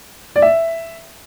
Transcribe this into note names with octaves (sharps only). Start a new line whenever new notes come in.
D5
E5